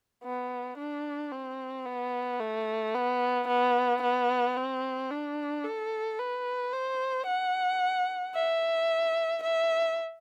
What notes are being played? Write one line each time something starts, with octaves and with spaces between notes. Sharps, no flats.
B3
D4
C4
B3
A3
B3
B3
B3
C4
D4
A4
B4
C5
F#5
E5
E5